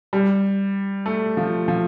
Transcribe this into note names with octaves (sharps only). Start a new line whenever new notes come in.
G3
A3
F3
F3